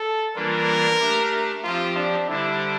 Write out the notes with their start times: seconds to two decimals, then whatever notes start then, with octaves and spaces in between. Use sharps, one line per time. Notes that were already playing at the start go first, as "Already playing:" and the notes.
Already playing: A4
0.36 E3 G3 A#3 D4 F4 A#4
1.00 A3 D4 G4
1.64 F3 C4 F4 G4 C5
1.96 D4
2.28 D3 G3 D4 E4 G4 C5